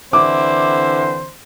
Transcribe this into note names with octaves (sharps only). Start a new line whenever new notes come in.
D3 E3 C4 E4 C5 D6